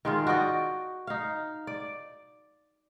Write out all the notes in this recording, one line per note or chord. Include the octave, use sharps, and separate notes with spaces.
D#3 G#3 F4
F#4 D5 D#5 G5
D#4 F5
D5